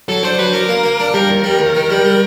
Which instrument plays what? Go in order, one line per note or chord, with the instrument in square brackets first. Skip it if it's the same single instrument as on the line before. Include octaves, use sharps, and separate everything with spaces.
[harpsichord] F#3 [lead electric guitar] A4
[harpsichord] D4 [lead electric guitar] C5
[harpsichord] F#3 [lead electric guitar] B4
[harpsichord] D4 [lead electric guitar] A#4
[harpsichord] A#3
A#3
D4
[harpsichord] G3 [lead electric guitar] A#4
[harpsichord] D#2
G3
D#2
D#3
G3
G3